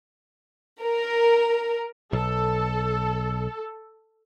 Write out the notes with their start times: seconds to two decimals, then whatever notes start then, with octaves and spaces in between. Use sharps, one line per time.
0.81 A#4
2.13 B1 A4